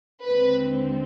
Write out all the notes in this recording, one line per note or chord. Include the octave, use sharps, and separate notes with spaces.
D#2 D3 G#3 C4 B4